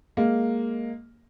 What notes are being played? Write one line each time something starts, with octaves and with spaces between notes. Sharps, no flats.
G#3 A#3